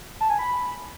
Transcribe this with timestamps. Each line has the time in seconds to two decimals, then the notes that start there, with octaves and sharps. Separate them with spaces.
0.21 A5
0.30 G#5
0.39 B5